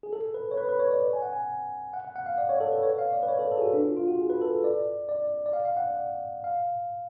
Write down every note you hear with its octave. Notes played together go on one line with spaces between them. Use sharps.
G#4
A4
B4
C#5
B4
B4
C#5
D5
G#5
F#5
G#5
F#5
F#5
F#5
F5
D5
C#5
A4
B4
C#5
F5
D5
B4
C#5
A4
A4
G#4
F#4
D4
F4
F4
F#4
G#4
B4
A4
D5
D5
D5
F5
F5
F#5
D5
F5